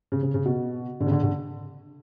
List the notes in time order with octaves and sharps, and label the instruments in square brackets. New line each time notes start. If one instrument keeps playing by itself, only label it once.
[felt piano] C#3
C#3
C#3
B2
D3
C#3
D3
D3